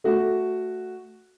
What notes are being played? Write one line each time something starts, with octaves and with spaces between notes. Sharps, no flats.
A3 F#4